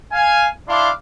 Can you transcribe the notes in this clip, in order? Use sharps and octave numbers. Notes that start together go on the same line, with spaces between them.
F5 G#5
D4 E4 F5 A5 C6 D6